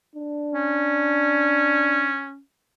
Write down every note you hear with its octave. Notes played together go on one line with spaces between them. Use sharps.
D4
C#4